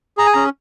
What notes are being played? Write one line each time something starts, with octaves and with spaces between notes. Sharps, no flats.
G#4 A#5
G#5
C#4 A#5